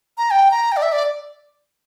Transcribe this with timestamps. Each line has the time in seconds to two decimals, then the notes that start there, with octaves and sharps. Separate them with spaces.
0.18 A#5
0.31 G5
0.51 A#5
0.72 G5
0.77 D5
0.82 E5
0.92 D5